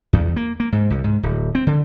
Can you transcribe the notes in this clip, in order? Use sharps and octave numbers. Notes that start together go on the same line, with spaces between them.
E2
A#3
A#3
G#2
C2
G#2
D1
C4
D3